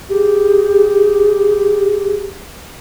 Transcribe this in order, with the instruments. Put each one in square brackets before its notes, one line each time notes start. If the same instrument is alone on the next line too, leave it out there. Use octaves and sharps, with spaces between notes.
[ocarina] G4 [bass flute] G#4